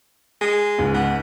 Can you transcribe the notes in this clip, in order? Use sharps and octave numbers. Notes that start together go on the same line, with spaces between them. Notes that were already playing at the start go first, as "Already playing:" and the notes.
G#3
C#2 G#2
B3